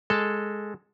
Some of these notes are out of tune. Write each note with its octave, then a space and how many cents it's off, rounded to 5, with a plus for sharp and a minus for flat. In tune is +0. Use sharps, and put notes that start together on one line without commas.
G#3 +0 A4 +0